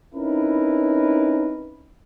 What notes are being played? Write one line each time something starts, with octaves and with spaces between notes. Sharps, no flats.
C4 C#4 D#4 E4 A#4 B4